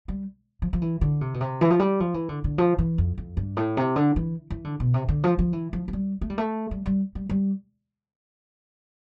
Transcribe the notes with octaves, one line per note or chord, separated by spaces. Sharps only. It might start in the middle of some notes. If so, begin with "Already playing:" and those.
G3
F3
F3
E3
D3
C3
B2
C3
E3
F3
G3
F3
E3
D3
D3
F3
E3
F2
F2
G2
A2
C3
D3
E3
E3
D3
B2
C3
D3
F3
F3
E3
F3
F3
G3
A3
G3
A3
G3
G3
G3
G3